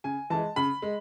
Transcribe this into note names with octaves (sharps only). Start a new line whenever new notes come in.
C#3 G#5
E3 G#3 A5
C#3 B5
G#3